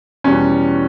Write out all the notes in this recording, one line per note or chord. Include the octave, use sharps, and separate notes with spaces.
E2 B2 G3 C#4